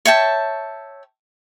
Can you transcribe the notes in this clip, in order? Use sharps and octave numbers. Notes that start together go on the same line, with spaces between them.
C#5 E5 G5 A5